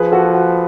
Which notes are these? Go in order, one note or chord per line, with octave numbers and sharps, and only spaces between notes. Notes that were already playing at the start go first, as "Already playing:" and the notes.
Already playing: F3 G#4 B4
F#4 A4
F#4